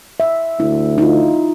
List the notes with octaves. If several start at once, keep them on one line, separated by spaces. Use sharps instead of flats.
E5
D2 E4
D#4 F4